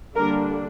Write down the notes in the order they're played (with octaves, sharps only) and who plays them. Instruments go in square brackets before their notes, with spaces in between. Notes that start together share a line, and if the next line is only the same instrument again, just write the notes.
[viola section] D3 G3 A#3 D4 A#4